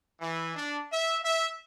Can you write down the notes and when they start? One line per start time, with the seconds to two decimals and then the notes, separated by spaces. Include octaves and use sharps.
0.20 E3
0.55 D4
0.92 E5
1.24 E5